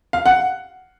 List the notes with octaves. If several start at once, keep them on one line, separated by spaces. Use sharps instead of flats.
F5
F#5